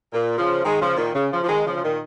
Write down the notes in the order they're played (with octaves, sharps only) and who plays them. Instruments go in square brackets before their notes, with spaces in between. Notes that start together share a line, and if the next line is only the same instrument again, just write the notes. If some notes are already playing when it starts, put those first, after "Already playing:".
[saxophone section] A#2
C#3 F3
D#3 G#3
C#3 F3
A#2 D#3
C#3
C#3 F3
F3
D#3 G#3
C#3 F3
C#3
A#2 D#3